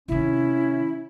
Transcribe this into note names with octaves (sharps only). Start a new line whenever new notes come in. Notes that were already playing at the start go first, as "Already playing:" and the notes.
C3 D#3 C#4 E4